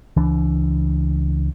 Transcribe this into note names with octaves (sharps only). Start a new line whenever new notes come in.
C#2 E3 D4